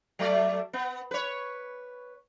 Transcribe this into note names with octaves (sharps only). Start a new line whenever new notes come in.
F#3 A3 D5
B3
B4 C#5